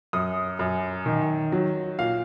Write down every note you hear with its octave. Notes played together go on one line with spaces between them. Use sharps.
F#2 D#6
F#2
D#3
F#3
A#2 F5